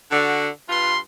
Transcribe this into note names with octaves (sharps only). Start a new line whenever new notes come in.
D3 F#4
G2 F4 B4 C6